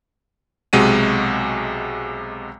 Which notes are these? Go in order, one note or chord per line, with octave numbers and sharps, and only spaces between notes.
B1 C3 G#3 F#4 D#7